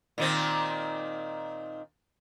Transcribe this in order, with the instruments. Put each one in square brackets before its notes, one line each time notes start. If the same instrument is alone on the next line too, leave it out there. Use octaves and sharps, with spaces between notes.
[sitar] A#2 D#3 C4